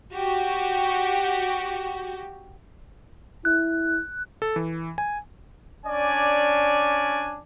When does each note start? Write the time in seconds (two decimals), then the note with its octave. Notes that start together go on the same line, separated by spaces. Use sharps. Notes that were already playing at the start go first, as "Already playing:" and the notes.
0.15 F#4 G4
3.45 E4 F#6
4.42 A4
4.56 E3
4.98 G#5
5.86 C#4 D4 D5 G#5